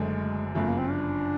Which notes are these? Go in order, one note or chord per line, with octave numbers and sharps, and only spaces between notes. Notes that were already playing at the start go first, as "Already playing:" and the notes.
Already playing: F#1 F#2 D3 F#3 G#3 A3
G1 F#2 C#3 F3 A3
A#3
C4
D4